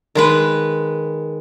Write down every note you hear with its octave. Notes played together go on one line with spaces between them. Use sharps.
D#3 G#3 B4